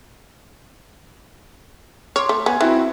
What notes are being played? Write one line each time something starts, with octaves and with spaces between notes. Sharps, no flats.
C#5 C6 D6 F6
A3
B3 G#5 G#6
E3 C4 E4 F#4